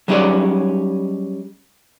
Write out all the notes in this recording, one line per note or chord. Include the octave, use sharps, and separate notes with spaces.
F#3 G3 C#4 D#4 G#4 D5